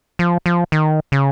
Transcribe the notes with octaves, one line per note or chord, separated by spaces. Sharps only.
F3
F3
D#3
C#3